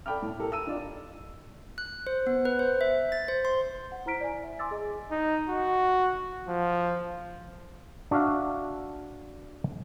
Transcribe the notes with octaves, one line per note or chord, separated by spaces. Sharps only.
A4 D5 G5 B5 D6 F6
A2
G4 A4 A#4
E6 D#7
D4 D#4 F4 D5
F#6
C5
B3
B4
C5
E5
A6
C5
C6
F#5
E4 C5 A#5 F6 B6 D7
D5 G#5
E5
G#5 C6 D6 E6 A6
G#4 D#5
D#4
F#4
F3
D4 F#4 E5 F5